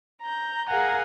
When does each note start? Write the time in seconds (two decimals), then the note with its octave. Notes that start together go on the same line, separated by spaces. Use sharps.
0.22 A#5 G6
0.67 G#4 A#4 F5 F#5 G#5 A#5